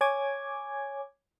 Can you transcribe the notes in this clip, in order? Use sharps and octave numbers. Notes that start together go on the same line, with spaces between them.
C#5 G#5 D6 G#6